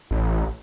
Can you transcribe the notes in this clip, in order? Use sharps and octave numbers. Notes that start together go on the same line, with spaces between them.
A1